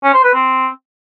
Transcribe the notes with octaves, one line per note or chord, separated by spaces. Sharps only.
C#4
C5
B4
C4